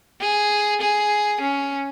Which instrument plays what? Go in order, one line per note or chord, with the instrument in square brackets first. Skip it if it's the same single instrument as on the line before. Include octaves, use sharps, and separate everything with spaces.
[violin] G#4
G#4
C#4